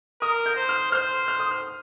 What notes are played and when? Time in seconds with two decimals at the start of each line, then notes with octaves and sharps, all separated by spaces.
0.21 A#4 D#6
0.46 G6
0.57 C5
0.69 F6
0.92 C5 F6
1.28 F6
1.40 D#6
1.51 F6